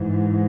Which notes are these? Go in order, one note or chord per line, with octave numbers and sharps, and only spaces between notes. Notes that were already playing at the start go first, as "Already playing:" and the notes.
Already playing: G#2 E3